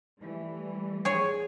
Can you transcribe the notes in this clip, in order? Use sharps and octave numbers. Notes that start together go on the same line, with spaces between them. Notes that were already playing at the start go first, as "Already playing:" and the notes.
E3 G3 A3
G#4 C#5